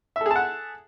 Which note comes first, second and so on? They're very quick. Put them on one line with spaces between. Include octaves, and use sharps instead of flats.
E5 A4 G#4 A5 F#5